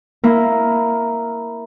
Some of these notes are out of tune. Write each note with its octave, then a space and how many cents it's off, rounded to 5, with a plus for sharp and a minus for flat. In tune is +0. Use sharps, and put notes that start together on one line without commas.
A#3 +0 E4 +0